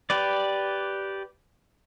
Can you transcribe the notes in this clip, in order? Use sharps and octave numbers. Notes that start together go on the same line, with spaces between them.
G4 B4 D5